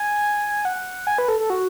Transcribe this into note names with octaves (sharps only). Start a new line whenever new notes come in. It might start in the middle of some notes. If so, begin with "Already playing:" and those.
Already playing: G#5
F#5
G#5
B4
A4
A4
F#4